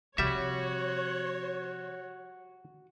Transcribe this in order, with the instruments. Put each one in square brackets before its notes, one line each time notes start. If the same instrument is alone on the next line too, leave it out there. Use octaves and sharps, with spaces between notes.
[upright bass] C3 F3 [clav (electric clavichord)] G3 E5 [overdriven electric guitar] F#4 [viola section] C#5